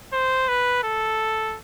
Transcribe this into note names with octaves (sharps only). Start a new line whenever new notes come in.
C5
B4
A4